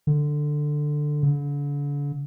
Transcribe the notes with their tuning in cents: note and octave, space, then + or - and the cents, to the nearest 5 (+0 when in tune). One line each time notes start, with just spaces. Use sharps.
D3 +10
D3 -40